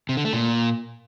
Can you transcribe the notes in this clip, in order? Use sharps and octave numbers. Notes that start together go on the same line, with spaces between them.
C3
D3
A3
A#2